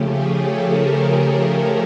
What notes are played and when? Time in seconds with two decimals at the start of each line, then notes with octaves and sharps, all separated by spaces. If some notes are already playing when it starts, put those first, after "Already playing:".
Already playing: C#3 F3 A3 C#4 G4
0.08 G#4
0.39 A4
0.70 A#4